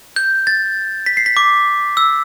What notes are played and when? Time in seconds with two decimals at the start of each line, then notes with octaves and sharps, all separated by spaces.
0.16 G6
0.47 A6
1.06 B6
1.17 C7
1.26 B6
1.37 D6
1.97 E6